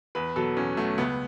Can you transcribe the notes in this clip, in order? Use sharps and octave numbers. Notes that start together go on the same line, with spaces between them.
E2 B4
B2 F#3 A4
E2 C#4
B2 F#3 A3
C#2 B3